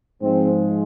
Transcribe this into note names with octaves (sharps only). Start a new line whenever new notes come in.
G#2 F3 G#3 C4